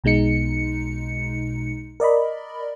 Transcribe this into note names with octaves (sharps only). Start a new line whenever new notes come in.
B1 B2 G#3 D#4 C#7
A#4 D5 D#5 B5